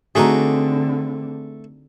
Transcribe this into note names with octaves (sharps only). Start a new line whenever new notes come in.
D3 A3 C4 D#4 F#4 G#4 B4 D6